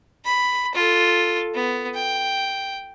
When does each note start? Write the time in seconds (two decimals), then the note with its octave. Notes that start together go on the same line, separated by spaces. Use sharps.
0.25 B5
0.74 F4 A4
1.54 B3
1.95 G5